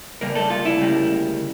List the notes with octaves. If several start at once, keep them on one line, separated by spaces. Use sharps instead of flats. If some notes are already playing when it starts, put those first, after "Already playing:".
D2 C#3 G3 A#3 A#4
A4
F4
E4
D2 C#3 G3 A#3